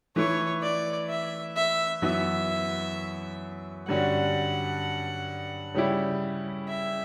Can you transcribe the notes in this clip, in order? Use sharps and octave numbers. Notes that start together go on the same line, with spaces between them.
E3 A3 E4 C#5
D5
E5
E5
F#2 E3 B3 F#4 E5
G2 D3 G3 C#4 F#4 F#5
C#3 G3 C#4 E4 G4
E5